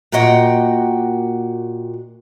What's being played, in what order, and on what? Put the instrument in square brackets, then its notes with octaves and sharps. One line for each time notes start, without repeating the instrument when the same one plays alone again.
[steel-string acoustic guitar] A#2 A#3 F#4 D#5 F#5 G5